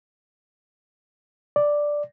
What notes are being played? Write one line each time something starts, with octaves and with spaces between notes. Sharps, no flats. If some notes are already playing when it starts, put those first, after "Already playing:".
D5